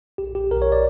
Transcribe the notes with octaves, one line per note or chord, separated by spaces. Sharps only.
B1 G4
B1 G4
B1 A#4
C#5
D5